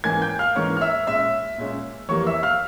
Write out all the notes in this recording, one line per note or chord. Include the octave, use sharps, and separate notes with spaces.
G#2 E3 A#3 C#4 G#5 G#6
G5 G6
F5 F6
G#2 E3 A#3 C#4 C#5 C#6
F6
E5 E6
A#2 G#3 C#4 E5 E6
A#2 G#3 C#4
F2 E3 G3 A#3 C#5 C#6
E5 E6
F5 F6